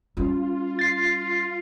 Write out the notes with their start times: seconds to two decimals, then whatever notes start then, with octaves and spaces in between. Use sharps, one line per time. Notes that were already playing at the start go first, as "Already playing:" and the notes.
0.17 G3 C#4 F4
0.79 A6 C7